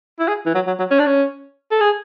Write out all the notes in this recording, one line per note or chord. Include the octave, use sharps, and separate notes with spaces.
E4
G#4
E3
F#3
F#3
F#3
C#4
D4
C#4
A4
G#4